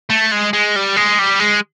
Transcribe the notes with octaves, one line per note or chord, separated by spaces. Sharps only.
A3
G#3
G#3
G3
G#3
G3
G#3